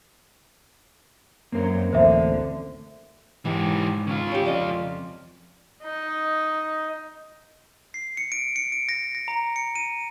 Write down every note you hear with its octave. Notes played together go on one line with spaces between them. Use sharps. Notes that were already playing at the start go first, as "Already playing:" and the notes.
F#2 F#3 A#3 C4 A#4
A1 D2 D3 C5 E5
G#2 E3 G4
C#3 F4
C#4 G4
F2 D5 D#5
D#4
C7
C#7
D7
C#7
D7
A#6
A#6
A#5
C#7
D#7